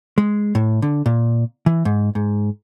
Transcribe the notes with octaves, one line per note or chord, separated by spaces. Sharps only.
G#3
A2
D3
A#2
E3
G#2
G#2